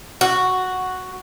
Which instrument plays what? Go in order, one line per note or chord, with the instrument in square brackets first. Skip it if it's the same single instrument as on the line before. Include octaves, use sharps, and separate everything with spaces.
[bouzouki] F#4